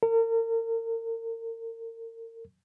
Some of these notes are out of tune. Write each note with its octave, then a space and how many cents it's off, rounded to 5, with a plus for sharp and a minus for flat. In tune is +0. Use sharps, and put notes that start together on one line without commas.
A#4 -35